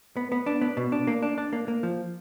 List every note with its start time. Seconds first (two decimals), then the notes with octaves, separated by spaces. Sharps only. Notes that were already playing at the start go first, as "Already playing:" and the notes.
0.17 B3
0.32 B3
0.46 D4
0.62 B3
0.77 B2
0.92 D4
1.07 A#3
1.22 D4
1.38 D4
1.53 A#3
1.68 A#3
1.83 F3